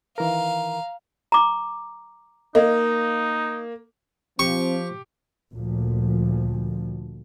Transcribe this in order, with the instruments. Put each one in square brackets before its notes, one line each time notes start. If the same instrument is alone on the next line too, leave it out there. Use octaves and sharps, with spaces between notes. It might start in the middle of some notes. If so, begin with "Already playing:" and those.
[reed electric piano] D#3 E3 A#4 [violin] F5 [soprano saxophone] A#5
[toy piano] A#5 D6
[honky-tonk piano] A#3 [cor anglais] D#4 [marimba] D#5
[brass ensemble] F3 [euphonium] C4 [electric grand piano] G4 [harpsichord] C#6
[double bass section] D2 A#2 F3